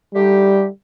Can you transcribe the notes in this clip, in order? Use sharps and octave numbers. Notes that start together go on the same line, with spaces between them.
D3 G3 A3 D#4 G4